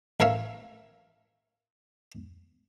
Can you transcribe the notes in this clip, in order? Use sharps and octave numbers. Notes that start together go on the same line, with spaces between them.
A1 A#4 C#5 E5 F5